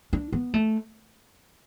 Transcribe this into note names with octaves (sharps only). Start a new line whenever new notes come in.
D4
B3
A3